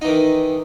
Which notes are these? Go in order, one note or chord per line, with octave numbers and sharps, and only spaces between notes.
D#3 E3 D#4